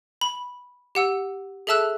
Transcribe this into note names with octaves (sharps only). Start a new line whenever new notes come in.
B5
G4 F#5 E6
G#4 A4 E5 A5 E6 F#6